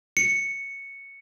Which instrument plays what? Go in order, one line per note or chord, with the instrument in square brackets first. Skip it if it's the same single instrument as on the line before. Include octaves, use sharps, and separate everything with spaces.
[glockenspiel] C#7